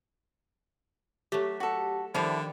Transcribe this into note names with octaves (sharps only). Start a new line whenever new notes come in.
F#3 A3 G4
F#4 A4
D3 D#3 F3 G3 E4 F5